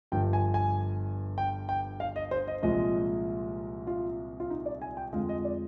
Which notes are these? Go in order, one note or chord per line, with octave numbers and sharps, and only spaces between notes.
G1 G2 F3 G5
G#5
G#5
G5
G5
F5
D#5
C5
D#5
C2 A#2 F3 G#3 D#5
F4
F4
D#4
D5
G#5
G5
F2 D3 F3 G#3 F5
D#5
D5